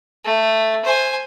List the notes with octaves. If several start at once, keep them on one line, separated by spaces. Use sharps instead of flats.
A3
C5 G#5